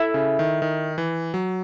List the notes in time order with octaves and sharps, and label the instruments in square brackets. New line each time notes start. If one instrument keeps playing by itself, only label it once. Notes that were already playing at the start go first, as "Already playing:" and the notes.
Already playing: [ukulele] E4 A4 E5
[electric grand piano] C#3
D#3
D#3
E3
F#3